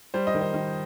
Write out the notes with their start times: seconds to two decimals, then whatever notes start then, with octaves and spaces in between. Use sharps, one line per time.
0.14 G3 C5
0.27 D#5
0.35 D#3
0.41 C5
0.54 D#3